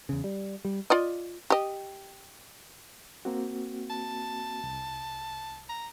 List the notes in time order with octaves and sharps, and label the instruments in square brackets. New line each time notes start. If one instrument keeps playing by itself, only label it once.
[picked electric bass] E2 C#3
G3
G3
[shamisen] F4 D5 D#5
G4 D#5
[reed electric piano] A#3 C4 F#4
[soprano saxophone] A5
[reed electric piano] C2
[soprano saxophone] A#5